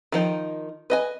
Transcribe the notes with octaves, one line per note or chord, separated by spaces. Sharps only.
D#3 F3 D#4
B4 D#5 G#5